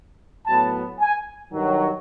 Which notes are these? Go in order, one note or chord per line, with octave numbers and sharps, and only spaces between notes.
A2 F#3 B3 A5
G#5
G2 D#3 F#3